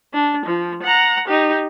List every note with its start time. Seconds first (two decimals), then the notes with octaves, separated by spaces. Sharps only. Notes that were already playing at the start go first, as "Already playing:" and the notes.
0.14 D4
0.46 F3
0.83 F#5 A#5
1.28 D#4 G4